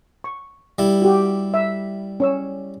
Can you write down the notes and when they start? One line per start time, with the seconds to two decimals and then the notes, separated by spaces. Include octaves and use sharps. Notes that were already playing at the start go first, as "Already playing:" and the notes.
0.24 C#6
0.78 G3 E4
1.02 F#4 G4
1.54 E5
2.20 C#4 C#5 E6